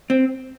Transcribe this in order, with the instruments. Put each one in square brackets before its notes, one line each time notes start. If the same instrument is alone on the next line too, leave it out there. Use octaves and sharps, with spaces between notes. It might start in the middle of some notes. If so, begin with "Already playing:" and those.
[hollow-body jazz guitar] C4